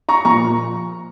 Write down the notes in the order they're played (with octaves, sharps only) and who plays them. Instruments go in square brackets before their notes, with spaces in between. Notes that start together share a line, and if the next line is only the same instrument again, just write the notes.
[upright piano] A#5 C#6
A#2 F3 A#5 C#6